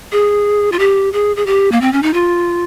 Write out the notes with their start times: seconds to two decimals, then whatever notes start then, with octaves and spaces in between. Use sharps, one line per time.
0.12 G#4
0.72 F4
0.79 G4
1.13 G#4
1.36 G#4
1.47 G4
1.72 A#3
1.81 C4
1.93 C#4
2.03 D#4
2.13 F4